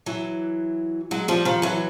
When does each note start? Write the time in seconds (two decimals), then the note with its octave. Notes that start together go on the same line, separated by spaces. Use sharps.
0.06 E3 F#3
1.11 F#3 G#3
1.28 F3 G3
1.45 D#3 F3
1.62 E3 F#3